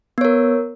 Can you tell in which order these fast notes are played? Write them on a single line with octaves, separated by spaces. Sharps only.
B3 C#5 A#4